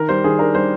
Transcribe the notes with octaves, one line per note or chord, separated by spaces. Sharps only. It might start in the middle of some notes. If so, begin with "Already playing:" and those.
Already playing: D#3 A#4
G3 C5
D#3 G#4
D4 A#4
G3 C5